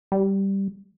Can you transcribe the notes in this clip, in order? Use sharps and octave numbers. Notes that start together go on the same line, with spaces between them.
G3